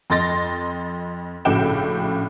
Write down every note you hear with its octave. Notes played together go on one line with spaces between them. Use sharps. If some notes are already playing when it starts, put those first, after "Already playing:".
F2 D#5 C6 A6 A#6
A#1 A2 C#3 F#4 G5 E7